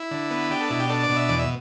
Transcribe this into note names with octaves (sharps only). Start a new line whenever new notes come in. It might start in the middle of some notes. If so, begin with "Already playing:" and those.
Already playing: E4
D3
B3
D4 G4
A4
B2 E4
G4
D4 A4
D5
B2
E5
E2 D5
E5